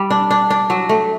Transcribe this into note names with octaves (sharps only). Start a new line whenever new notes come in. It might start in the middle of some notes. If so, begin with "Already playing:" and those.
Already playing: G3
D4
D4
D4
F#3
A3